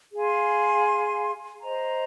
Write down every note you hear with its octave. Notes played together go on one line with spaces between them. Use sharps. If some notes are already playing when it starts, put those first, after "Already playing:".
G#4 F5 G#5 C6
C5 D#5 A#5